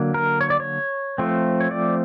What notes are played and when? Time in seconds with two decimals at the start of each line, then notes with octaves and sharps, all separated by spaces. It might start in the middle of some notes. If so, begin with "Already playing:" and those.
Already playing: D3 F#3 A#3
0.14 A#4
0.41 C#5
0.50 D5
0.60 C#5
1.18 F3 A3 C4
1.60 C#5
1.71 D5